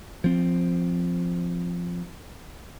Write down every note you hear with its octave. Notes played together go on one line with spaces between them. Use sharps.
F3 C4